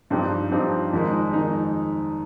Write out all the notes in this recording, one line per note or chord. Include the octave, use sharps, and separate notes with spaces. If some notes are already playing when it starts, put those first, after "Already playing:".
G2 F3 C4 D#4 G4
G2 F3 C4 D#4 G4
F2 D#3 G#3 D#4
F2 D#3 G#3 D#4